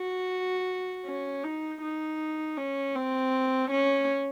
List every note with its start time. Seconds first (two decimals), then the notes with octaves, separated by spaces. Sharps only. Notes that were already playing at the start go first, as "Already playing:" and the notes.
Already playing: F#4
1.06 C#4
1.44 D#4
1.82 D#4
2.57 C#4
2.95 C4
3.71 C#4